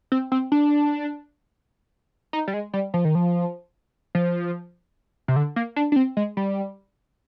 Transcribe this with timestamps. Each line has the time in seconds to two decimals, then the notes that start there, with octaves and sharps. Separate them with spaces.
0.12 C4
0.32 C4
0.52 D4
2.33 D#4
2.48 G3
2.54 G#3
2.73 G3
2.94 F3
3.05 D#3
3.15 F3
4.15 F3
5.28 C3
5.36 D3
5.56 A#3
5.76 D4
5.92 D4
5.96 C4
6.17 G#3
6.37 G3